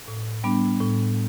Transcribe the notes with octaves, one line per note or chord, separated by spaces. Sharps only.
A2
G3 B3 D4
A2